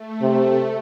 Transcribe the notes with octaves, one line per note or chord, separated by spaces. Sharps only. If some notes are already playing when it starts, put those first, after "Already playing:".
Already playing: A3
C3